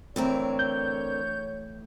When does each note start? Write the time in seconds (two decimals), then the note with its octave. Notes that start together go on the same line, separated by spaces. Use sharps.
0.16 A2 D3 E3 C4 A#4 C#5
0.59 G6